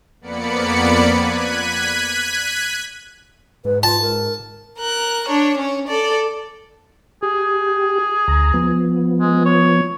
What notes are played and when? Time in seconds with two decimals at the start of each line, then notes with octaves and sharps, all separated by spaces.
0.21 F2 A#3 B3 D5 B5 C#7
1.14 F#6 G#6 B6 D#7
3.65 G#2 B4
3.83 F4 A5
4.01 A#4
4.78 A#4 F#6
5.29 D4 C#5
5.58 C#4 C#5
5.88 A4 D5
7.23 G4 G#4
8.28 D2 A#5
8.54 F3 B3
9.20 G#3
9.45 C#5